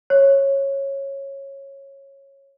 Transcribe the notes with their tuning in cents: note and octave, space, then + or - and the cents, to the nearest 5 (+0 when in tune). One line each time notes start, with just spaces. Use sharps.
C#5 -15